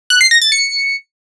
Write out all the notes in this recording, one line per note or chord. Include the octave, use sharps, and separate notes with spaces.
F#6
C7
A#6
A6
C#7